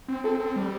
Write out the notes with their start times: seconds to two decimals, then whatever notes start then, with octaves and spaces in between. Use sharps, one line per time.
0.08 C4
0.24 C4 A4
0.40 C4
0.56 G3